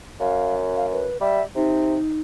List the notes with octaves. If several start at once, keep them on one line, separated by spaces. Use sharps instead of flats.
F#2 F5
F5
B4
G3 E5
C3 D#4